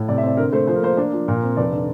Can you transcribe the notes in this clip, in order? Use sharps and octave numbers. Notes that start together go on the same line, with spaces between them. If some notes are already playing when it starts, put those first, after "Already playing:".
Already playing: A2
C3 D5
E5
C4 D5
D3 A#4
A3 C5
F3 C5
A#4
A#3 C5
D4
F3
A#2 A#4
C4
F1 D5
D3